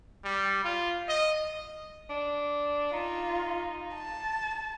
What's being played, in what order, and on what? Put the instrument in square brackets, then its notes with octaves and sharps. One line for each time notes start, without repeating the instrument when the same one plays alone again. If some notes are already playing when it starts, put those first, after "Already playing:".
[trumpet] G3
F4
D#5
[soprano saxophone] D4
[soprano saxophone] D#4 [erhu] F4
[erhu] A5